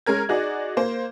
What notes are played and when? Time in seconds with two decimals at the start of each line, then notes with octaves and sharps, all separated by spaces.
0.06 G#3 C#4 A#4 G#6
0.29 D#4 F#4 G#4 D5
0.77 A#3 C5